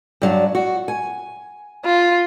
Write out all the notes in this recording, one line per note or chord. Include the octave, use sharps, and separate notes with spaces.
G2 F#3 D4
F#4
G#5
F4